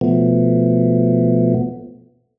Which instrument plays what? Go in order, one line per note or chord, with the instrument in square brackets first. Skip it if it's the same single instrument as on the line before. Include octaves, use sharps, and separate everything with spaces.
[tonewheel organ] B2 F3 A3 B3